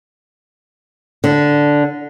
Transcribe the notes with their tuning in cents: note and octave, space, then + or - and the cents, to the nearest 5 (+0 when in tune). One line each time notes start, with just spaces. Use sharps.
D3 -5